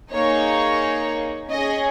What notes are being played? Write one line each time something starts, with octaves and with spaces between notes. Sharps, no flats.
A#3 D#4 G#4 C#5
C#4 G#4 D#5